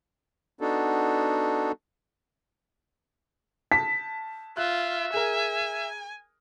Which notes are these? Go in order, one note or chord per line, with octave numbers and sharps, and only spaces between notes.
B3 D4 D#4 F#4 A4
A5 B6
F4 E5 F#6
G#4 A#4 G#5